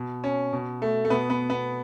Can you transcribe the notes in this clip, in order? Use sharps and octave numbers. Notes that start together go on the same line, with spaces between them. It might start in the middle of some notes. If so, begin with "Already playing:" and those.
Already playing: B2
C#4
B2
A3
A3
B2 B3
B3
B3